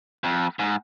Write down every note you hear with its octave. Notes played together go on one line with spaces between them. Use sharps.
F2
G#2